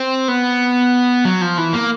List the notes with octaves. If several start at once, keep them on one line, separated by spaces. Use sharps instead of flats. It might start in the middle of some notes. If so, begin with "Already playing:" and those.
Already playing: C4
B3
F#3
F3
E3
A#3